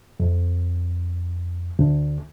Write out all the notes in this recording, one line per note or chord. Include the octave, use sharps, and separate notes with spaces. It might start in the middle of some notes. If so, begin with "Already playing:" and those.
F2
D2